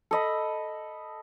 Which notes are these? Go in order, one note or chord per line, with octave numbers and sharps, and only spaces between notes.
A4 D#5 B5